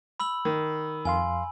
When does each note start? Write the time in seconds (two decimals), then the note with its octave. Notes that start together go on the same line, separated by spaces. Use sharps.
0.20 B5 E6 F#7
0.45 D#3
1.05 F2 F5 G#5 C6